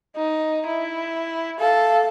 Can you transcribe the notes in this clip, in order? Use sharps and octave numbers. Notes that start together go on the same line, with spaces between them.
D#4
E4
A4 F5